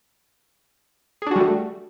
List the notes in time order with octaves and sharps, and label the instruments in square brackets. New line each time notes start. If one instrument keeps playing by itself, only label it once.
[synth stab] G#4
D4
F#4
G3
A3